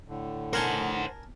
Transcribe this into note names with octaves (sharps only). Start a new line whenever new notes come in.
A2 D3
A#4 C5 F#5 G#5 A5